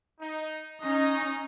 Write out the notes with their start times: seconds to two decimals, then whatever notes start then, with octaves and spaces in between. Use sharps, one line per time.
0.20 D#4
0.81 C#4 D#4 D#5